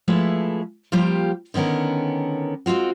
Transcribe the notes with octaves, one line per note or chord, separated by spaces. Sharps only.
F3 G#3 A3 E4 B4
F3 G3 A#3 F4 G4
D3 D#3 B3 C#4 A#4
G#3 C4 D4 F4 F#4